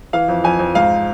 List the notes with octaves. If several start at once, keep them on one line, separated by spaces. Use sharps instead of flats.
E3 F5
F2
F2 G#5
F2
G#2 F5